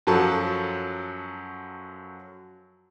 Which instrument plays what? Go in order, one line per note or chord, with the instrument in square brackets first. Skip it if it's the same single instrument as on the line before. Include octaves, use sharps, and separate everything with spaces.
[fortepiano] F#2 F3 F#3 A4 A5